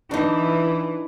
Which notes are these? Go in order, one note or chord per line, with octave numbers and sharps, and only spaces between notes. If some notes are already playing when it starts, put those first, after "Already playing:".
E3 D4 D#4